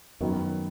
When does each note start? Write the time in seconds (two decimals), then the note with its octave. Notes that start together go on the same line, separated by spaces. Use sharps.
0.21 F#2 D#3 F#3 B3